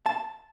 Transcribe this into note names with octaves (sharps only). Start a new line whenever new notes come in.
A5